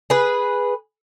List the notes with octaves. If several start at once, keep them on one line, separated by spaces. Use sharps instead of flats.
G#4 B4